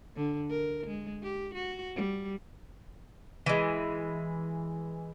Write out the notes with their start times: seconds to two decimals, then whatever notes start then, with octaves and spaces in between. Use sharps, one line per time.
0.16 D3
0.50 A#4
0.87 G#3
1.23 G4
1.54 F#4
1.96 G3
3.46 E3 G#3